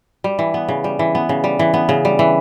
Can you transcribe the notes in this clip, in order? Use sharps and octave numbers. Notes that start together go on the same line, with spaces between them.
G3
E3
B3
C#3
G3
E3
B3
C#3
G3
E3
B3
C#3
G3
E3